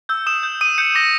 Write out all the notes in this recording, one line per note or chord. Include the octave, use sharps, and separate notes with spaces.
E6 G6
D#6 E7
G6
D#6 D#7
G6 C#7
D6 A#6